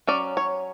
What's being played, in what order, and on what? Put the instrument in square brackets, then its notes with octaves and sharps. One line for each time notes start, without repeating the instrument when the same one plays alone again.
[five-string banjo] F#3 C#4 D5
C#5